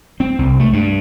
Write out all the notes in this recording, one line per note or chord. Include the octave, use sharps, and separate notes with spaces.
C4
C2
A3
G2